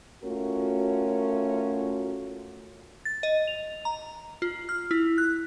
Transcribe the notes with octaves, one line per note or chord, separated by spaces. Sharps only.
A3 C#4 F4 F#4 A#4
A6
D#5
F7
A#5
F4
F6
E4
F#6